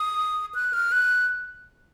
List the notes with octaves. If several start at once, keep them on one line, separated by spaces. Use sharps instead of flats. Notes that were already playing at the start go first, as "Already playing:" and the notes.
Already playing: D#6
F#6
F6
F#6